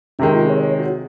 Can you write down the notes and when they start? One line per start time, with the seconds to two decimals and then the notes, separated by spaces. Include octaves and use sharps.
0.19 C3 D#3 G#3 C#4
0.35 F4
0.50 C#5
0.63 C#5
0.80 F#4